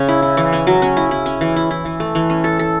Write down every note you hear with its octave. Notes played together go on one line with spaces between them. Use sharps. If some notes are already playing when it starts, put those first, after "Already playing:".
Already playing: C#3 C#4
E4
E4
E3
C#4
F#3
C#4
E4
E4
C#4
E3
E4
E4
E3
A3
E3
C#4
A4
A4